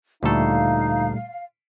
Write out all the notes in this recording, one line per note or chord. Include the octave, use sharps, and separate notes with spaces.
D2 A#2 G3 A3 D#4 A4 F5